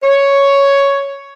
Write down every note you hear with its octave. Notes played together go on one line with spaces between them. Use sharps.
C#5